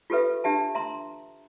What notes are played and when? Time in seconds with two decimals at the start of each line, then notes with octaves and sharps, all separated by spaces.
0.10 F4 G4 A4 B4 E5
0.44 D4 G4 E5 A5
0.75 E5 A#5 C6